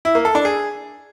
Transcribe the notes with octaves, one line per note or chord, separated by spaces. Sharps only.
E4
A#3
A4
D4
G#4